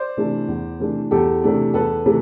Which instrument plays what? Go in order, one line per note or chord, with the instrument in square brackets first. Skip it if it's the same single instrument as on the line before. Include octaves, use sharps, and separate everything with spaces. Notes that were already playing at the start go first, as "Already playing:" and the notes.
Already playing: [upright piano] C5 D5
C3 E3 A3 D4
E2
C3 E3 A3 D4
E2 G4 A4
C3 E3 A3 D4
E2 A4 B4
C3 E3 A3